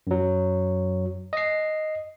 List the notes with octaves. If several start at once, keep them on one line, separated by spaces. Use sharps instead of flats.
F#2 F#3
D#5 C7